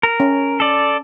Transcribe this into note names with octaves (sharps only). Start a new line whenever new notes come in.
A#4
C#4
A4 D5